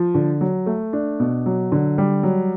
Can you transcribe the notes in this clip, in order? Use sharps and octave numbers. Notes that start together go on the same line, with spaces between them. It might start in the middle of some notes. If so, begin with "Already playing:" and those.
Already playing: F3
D3
F#3
A3
D4
B2
F#3
D3
G3
F#3